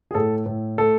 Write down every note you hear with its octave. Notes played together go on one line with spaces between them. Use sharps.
G#4
A2 A4
A2
A3 A4